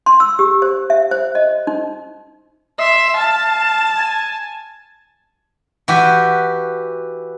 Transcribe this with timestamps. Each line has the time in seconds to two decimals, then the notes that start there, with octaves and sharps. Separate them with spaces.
0.06 C6
0.20 E6
0.39 G4
0.62 C5
0.90 E5
1.11 C5
1.35 D#5
1.67 D#4
2.79 E5 C6
3.17 F5 A5
3.97 G#5
5.88 E3 F#4 G4